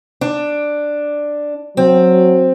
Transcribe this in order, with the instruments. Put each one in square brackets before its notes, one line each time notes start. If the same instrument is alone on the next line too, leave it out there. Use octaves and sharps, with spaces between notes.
[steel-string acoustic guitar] D4
[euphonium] F#3 [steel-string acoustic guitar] C4